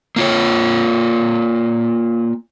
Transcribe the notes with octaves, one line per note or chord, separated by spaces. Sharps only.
A#3 F4 C#5